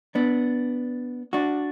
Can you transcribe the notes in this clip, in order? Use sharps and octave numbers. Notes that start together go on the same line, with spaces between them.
B3 D4
D4 F#4